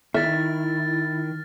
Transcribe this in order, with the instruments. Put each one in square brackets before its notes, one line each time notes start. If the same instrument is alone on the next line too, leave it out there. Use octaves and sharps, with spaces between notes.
[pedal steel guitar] D#3 [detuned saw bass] E4 [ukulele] E5 [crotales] F6 A6